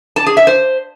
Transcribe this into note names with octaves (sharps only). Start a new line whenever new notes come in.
A5
G#4
E5
C5